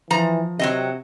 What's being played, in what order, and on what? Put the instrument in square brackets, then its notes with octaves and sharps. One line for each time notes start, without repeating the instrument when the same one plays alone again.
[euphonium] E3 [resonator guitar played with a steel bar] F3 A#5
[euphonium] C3 [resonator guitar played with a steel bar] F#3 C4 D#5